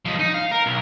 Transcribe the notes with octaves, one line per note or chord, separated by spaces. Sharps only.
F3 G#3
D#4
F5
A#4
B1